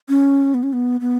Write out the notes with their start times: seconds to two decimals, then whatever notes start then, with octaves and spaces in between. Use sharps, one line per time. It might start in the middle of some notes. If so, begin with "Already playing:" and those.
0.09 C#4
0.54 B3
0.63 C#4
0.73 B3
1.01 B3